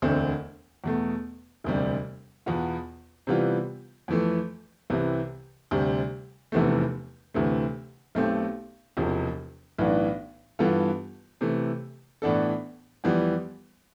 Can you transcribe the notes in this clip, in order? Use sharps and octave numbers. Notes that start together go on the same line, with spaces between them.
E1 D2 D3 A3 C4
E2 B2 A3
E1 D2 C3 G3
E2 B2 B3 F4
C3 E3 G3 B3 F4
F2 E3 A3
C2 C3 E3
D2 C3 G3
F1 E2 C3 E3 A3
D2 C3 E3 A3
B1 B2 A3 C4 G4
E1 E2 C3 F3
B1 A2 E3 B3 D4
G2 E3 B3 F4 A4
C3 E3 A3
A2 E3 B3 D4 A4
F2 E3 G3 B3